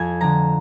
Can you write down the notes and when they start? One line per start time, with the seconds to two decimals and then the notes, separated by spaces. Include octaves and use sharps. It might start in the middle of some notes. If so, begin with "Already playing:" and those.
Already playing: F2 G#5 G#6
0.21 D3 F3 A#5 A#6